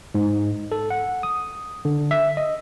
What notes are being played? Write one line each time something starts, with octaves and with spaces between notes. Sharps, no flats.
G#2
A4
F#5
D#6
D3
E5
D#5